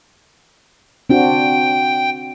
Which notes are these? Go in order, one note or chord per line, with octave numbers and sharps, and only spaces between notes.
C4 D4 F#4 G5